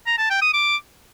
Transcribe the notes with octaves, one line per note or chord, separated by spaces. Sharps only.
A#5
A5
G5
D#6
D6